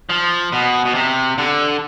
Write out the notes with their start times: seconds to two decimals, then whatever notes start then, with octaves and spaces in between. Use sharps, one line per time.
0.10 F3
0.53 B2
0.85 B2
0.95 C3
1.38 D3